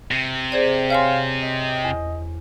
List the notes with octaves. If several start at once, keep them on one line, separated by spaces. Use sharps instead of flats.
C3
G#4 C5 D5
C#5 F5 G#5 C6
D#5
E2